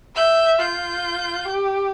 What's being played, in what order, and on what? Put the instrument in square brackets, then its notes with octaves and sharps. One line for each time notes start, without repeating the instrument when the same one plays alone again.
[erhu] E5 [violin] G6
[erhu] F4 [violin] G6
[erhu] G4